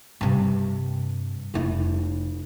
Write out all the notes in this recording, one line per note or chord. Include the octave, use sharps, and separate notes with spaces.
G2 C3
F1 E4